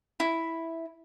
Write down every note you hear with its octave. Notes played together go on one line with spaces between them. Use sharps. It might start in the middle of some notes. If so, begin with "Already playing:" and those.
E4